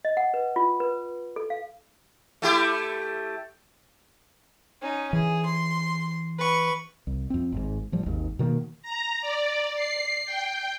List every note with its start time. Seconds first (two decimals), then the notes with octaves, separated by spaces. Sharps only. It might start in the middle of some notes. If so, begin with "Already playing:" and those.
0.05 D#5
0.17 F#5
0.34 B4
0.56 F4
0.80 B4
1.36 A4
1.50 F5
2.42 A3 E4 G4
4.82 C#4 D#4
5.13 E3 G#4
5.45 C6
6.38 B4 C#6
7.07 C2
7.30 F2 C4
7.52 G#1 G#2
7.92 A1 F3 G3
8.06 G#1 D#2 G#2 D#3
8.39 B2 D#3 F3 A#3
8.83 A#5
9.21 D5
9.76 C7
10.26 G5